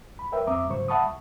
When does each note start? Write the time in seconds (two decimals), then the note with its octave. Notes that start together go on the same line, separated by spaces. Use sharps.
0.19 C#2 B5
0.32 A#4 B4 C#5 E5 G5
0.47 F2 C4 E5 A#5 D6 D#6
0.69 G#2 C#3 F#3 C5 C#6
0.88 E5 F#5 A5 B5 C#6 D#6
1.06 C#2